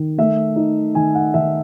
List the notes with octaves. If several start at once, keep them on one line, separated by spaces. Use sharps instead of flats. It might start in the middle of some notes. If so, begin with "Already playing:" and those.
Already playing: D#3
A3 E5
D#4
D#3 G#5
F#5
D#3 E5